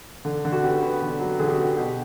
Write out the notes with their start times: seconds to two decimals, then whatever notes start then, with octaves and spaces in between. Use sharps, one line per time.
0.25 D3
0.45 D3
0.52 F#4
0.63 B3 G4
0.82 B3
1.02 D3
1.20 F#3
1.39 D3 G#4
1.47 G4
1.54 F#4
1.58 B3 G4
1.77 B2 G4